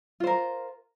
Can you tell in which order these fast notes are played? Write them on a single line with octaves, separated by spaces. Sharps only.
F4 C5 A#4